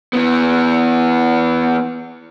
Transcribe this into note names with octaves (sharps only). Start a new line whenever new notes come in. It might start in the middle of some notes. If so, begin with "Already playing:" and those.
E3 B3